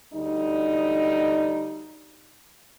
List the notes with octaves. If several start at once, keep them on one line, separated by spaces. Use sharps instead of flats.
D2 G3 D#4